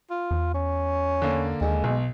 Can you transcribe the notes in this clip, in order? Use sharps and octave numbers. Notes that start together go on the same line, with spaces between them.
F4
E2
C#4
D3 A#3
D#2 G#3
B1 B2